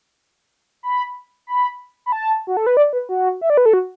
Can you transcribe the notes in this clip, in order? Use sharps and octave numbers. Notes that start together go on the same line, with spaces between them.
B5
B5
B5
A5
F#4
A4
B4
D5
B4
F#4
E5
D5
B4
A4
F#4